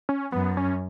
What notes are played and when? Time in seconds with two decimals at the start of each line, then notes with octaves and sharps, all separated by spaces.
0.09 C#4
0.32 F#2 B3
0.57 C#4